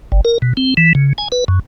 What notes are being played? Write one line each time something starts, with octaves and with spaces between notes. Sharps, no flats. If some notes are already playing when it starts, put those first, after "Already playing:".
G1
A#4
B2
C4
E3
C#3
G#5
B4
F#2